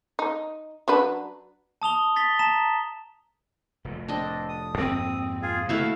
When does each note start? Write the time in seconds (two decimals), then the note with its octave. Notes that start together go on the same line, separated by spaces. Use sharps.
0.19 D#4
0.88 F#3 D4 B4
1.82 A5 D#6 F7 G7
2.16 A6 B6 G7
2.39 A5 A#5 E7
3.85 F1 A2
4.08 C4 D4 D#5
4.49 D#6
4.78 F2 G#2 A#3 C4
5.42 F4 G#4
5.69 C3 D#3 A3 A#3 E4 F#4 F5